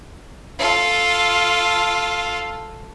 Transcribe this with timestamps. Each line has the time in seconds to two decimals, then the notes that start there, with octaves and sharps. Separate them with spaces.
0.59 F4 A4